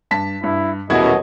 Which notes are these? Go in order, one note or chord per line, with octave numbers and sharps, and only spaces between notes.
G2 A5 B6
G2 E4
D#1 F#2 B2 E4 F#4 G#4 D#5 G#6